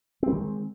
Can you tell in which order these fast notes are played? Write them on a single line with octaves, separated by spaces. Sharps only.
C4 G3 D#3 G#3